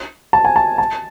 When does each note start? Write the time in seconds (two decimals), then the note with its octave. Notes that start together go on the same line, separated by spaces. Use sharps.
0.33 A5
0.45 G#5
0.56 A5
0.78 A5